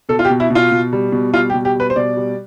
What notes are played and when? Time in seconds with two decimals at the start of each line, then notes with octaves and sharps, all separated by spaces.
0.09 B2 A4
0.19 F4
0.25 G4
0.30 B2
0.40 E4
0.50 B2
0.55 F4
0.71 B2
0.93 G3
1.12 B2
1.33 G3 F4
1.50 G4
1.54 B2
1.65 G4
1.75 G3 B4
1.90 C5
1.96 B2 D5
2.17 G3